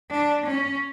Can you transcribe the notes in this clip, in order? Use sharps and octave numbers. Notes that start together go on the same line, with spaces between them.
D4
C#4